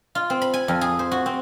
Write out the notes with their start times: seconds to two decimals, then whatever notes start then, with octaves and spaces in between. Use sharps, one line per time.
0.15 F4
0.30 C4
0.41 B5
0.54 G#5
0.68 F2
0.81 G#4
0.99 C5
1.11 F#4
1.26 C4